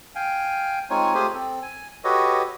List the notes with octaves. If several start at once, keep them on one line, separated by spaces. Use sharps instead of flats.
F5 G5 G#5
G#3 C4 D#4 F4 C#5 G#5
A3 F4 G4 G#4 C5 G#5
C4 A4
G#5
F#4 G4 A4 B4 C#5 D#5